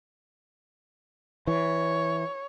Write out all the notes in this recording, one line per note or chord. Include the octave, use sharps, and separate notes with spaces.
E3 C#5